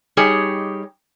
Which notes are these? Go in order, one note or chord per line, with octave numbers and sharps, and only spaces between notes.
G3 D#4 G4 G#4 C#5